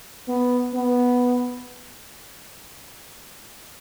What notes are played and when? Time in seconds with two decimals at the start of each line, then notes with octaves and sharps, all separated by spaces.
0.28 B3
0.74 B3